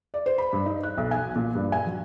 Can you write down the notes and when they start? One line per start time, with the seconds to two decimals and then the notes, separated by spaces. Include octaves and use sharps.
0.14 D5
0.26 C5
0.38 B5
0.53 G2
0.66 D#4
0.83 F#6
0.98 B1
1.11 G#5
1.36 A#2
1.55 G2
1.72 G#5
1.86 F#3